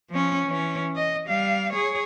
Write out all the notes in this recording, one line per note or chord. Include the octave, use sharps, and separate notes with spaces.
F3 C#4
E3 C#4
D#5
G3 F5
G#4 C#5